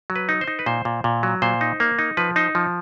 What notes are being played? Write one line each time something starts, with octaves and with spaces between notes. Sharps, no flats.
F#3
B4
D#4
C5
D#4
B4
A#2 C5
A#2
A#2
F#3
A#2 C5
D#4
A#3
D#4
F3 B4
D#4 C5
F3